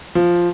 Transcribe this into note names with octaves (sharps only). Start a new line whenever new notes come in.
F3